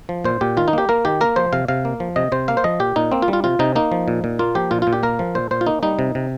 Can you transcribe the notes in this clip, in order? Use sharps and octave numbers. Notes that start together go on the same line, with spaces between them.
F3
A#2 C5
A#2 G4
D#3 F4
D#4
A#3 G4
A#3 A#4
D#3 G4
A#3 A#4
F3 C5
C3 F5
C3 F5
A#3
F3
C3 D#5
C3 C5
A#3 F5
C5
F3 D#5
A#2 G4
A#2 D#4
A#3 C4
F4
G3
F4
C3 F4
C3 D#4
A#3 D#4
F3
A#2
A#2
A#3 F4
F3 G4
A#2 F4
A#2 F4
G4
A#3 A#4
F3
A#2 C5
A#2 C5
F4
A#3 D#4
G3 D#4
C3
C3